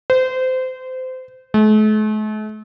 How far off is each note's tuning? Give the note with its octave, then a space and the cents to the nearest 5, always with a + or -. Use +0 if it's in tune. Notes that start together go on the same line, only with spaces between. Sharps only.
C5 -25
A3 -45